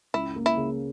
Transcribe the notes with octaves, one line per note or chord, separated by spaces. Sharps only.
C#2 E4
A#3
E4
C#3